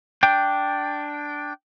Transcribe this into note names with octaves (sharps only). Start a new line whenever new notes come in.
D4 G5